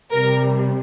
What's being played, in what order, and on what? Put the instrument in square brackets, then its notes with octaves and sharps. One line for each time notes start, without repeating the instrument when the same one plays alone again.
[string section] C3 G3 A#4